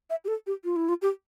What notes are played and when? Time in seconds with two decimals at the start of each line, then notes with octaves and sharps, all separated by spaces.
0.10 E5
0.24 G4
0.28 A4
0.47 G4
0.64 F4
0.76 E4
0.89 F4
1.02 G4